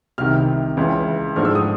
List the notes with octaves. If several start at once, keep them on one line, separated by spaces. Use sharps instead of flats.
C2 C3 D#3 F6
C#2 C#3 E3
G#2 F3 A3 D4 F6
E6
D#6